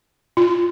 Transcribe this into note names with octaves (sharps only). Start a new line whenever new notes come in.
F4